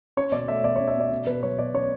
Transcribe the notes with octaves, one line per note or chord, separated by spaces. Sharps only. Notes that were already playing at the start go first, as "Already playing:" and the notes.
C#4 C#5
B2 D5
A3 E5
B2 D5
C#5
C#4
E5
B2 D5
C#4
B2 B4
F#3 C#5
B2 D5
C#4 C#5